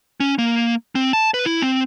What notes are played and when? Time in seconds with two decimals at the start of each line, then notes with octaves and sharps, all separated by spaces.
0.20 C#4
0.39 A#3
0.95 C4
1.13 A5
1.34 B4
1.46 E4
1.62 C4